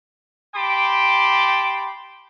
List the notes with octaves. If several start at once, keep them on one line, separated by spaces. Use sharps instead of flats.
G4 G5 A5 B5 C6 D6